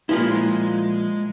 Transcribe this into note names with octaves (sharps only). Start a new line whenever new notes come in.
A#2 F3 G#3 E4 C6